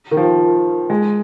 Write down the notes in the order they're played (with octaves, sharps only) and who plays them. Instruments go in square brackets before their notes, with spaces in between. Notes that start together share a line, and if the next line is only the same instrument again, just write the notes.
[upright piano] D#3
F3
G#3